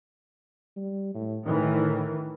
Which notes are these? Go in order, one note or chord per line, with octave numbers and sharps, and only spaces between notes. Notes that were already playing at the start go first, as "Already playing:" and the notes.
G3
A2
A2 D#3 E3